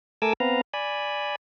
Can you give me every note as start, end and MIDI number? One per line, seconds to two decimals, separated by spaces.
0.22 0.33 57
0.22 0.33 69
0.22 0.33 70
0.22 0.33 80
0.22 0.33 86
0.22 0.33 88
0.40 0.61 59
0.40 0.61 60
0.40 0.61 71
0.40 0.61 77
0.40 0.61 82
0.74 1.36 74
0.74 1.36 80
0.74 1.36 83